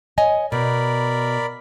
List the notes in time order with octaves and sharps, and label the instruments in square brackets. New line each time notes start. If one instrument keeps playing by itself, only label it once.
[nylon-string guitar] C#5 D#5 G#5
[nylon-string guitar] B2 [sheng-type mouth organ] A#4 D5 B5